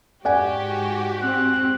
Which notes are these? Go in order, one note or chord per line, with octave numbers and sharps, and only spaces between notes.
G#2 F#4 G4 D5 F#5 G#5
C4 F#6